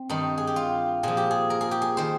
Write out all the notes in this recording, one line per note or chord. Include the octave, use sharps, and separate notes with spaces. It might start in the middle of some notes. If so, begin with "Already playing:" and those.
Already playing: C4
G2 D#3 D#4
G#4
G4
F4
A#2 F3 G#4
G4
G#4
A#4
G#4
G4
G#4
D#3 C5